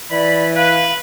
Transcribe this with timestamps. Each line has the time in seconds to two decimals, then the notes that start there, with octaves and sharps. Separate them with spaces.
0.11 E3 D5 B5
0.55 B4 F5